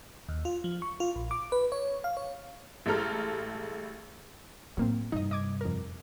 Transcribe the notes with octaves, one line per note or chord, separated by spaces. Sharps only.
D#2
F4
F3
C#6
F4
A#1
D6
B4
C#5
F5
C#5
A1 G3 G#3 A4 A#5 F6
A2 F#3 A#3 C4
G2 C3 D#4 D#5
D#5 D6 G#6
F2 A#4